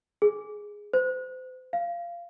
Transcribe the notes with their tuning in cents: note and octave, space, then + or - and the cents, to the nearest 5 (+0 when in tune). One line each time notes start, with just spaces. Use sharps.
G#4 -5
C5 -35
F5 -20